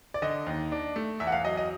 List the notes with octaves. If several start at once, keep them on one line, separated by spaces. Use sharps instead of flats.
D5
D3 D#5
D#2
D4
A3
E2 E5
F#5
F5
F#3 D#5
D#5